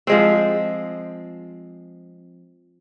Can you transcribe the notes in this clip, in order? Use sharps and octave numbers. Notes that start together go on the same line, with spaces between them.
F3 G#3 C4